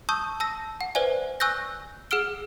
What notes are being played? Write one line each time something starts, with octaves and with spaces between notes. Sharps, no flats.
A5 C#6 D#6 E6 G6
A5 E6 A#6
F#5
B4 C5 D5 E5 G#5
G#5 C#6 E6 F#6 G6 A#6
G#4 F#5 E6 F6 D7 G7